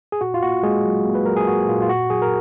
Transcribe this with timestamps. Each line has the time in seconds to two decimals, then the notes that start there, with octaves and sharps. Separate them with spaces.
0.12 G#4
0.21 A#2 F#4
0.34 F4
0.43 A#3 F#4
0.63 G#3 A#3 G#4
0.85 F#3
1.05 A#3
1.15 B4
1.26 F#3 A#4
1.37 G#4
1.47 A#3 F#4
1.68 A#2 F4
1.82 F4
1.89 A#2 F#4
2.10 F#3 G#4
2.22 A#4